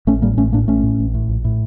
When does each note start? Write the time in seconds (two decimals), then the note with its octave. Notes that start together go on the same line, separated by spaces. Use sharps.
0.07 A1 A3 C#4
0.22 A2 G3 A#3
0.37 A1 A3 C#4
0.53 A2 A#3 D4
0.68 A1 A3 C#4
0.83 A2
0.99 A1
1.14 A2
1.29 A#1
1.45 A2